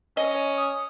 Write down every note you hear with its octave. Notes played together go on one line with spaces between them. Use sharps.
C#4 D#5
D#6